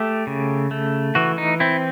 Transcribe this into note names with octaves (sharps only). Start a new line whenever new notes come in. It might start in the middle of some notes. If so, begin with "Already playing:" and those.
Already playing: A3 G4
C#3
A3
E3 F#4
D#4
C4 E4